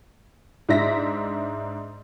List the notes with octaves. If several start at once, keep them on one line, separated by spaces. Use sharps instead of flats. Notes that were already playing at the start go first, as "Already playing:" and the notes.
G#2 D4 E5 A#6 B6